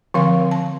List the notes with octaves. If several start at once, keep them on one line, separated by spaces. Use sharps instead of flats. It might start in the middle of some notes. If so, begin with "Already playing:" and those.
D3 F3 C4 F5
A5